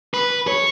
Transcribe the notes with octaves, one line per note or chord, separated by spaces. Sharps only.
B4
C#5